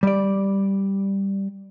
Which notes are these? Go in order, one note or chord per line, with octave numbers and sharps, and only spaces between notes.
G3 D5